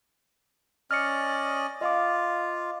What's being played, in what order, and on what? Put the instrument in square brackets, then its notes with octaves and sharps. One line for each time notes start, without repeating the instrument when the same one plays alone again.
[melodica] C#4 D5 D#5 [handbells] F6 C#7
[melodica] F4 [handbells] D#5 F5 D6